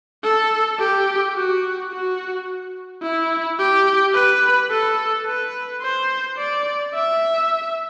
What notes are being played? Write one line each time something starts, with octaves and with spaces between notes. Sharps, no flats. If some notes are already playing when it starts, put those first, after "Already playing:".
A4
G4
F#4
F#4
E4
G4
B4
A4
B4
C5
D5
E5